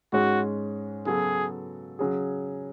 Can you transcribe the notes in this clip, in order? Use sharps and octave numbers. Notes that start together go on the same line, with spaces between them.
G#2 G#3 C#4 F#4
C#3 F#3 B3 F#4 G#4 A4
C#3 F#3 C#4 G#4